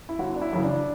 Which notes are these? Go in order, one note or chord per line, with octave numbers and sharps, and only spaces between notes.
E4
G1 F#4
D4
E4
F#2 C#3 E3
D4